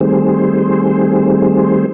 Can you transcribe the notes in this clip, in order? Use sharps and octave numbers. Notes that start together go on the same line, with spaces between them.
D#3 G3 A3 C4 G#4 C5